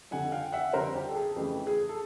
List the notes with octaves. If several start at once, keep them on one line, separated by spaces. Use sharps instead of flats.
F2 D3 G3 F#5 G#5
F5 G5
E5 F#5
F2 D3 G3 A#4 C5
G4
A4
G#4
F2 C#3 E3 A3 G4
G#4
A4